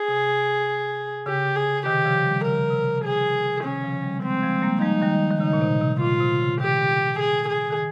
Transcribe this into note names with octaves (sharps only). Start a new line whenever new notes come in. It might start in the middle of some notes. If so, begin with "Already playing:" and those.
Already playing: G#4
C3
C#3 G4
G#4
C3 D#3 G4
C#3 F3
D#3 G3
C#3 F3 A#4
C3
C#3
C3 G#4
C3 D#3 C#4
C#3 F3
D#3 G3
F3 G#3 C4
F3 G#3
G#3
G3 A#3
F3 G#3 D#4
D#3 G3
D#3
C#3 D#4
A#2
C3
C3
A#2 F4
C3
C#3
C3 D#3 G4
G#4
G#4
D#3